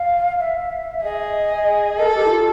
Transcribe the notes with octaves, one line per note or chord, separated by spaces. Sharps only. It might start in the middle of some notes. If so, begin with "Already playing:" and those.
Already playing: F5
E5
E5
G#4 D#5
A4 A#4
G4
E4
F4